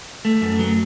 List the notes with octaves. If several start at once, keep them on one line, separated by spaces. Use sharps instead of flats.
A3
F#2
F#3